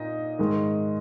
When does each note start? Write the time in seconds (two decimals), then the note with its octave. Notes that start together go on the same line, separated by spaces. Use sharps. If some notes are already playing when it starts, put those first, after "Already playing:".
Already playing: A#2 D#4 D#5
0.39 G#2 D#3 G#3